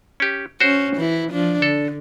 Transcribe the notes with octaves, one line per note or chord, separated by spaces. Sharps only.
C#4 G4
C#4 F#4 C5
E3 E4
F3 D4
D3 A4